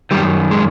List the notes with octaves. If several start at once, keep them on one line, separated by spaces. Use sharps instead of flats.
F#2 D#3 G3
G#3